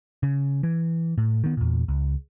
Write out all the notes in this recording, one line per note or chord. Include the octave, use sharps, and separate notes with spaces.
C#3
E3
A2
D#3 B3
E2 A#2
C#2